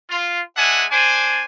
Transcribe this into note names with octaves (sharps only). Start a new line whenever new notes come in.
F4
G#3 D4 E5 F#5 G#5
D4 C5 D5 G#5